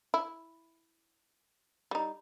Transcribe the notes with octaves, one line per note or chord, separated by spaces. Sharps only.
E4
G3 D#4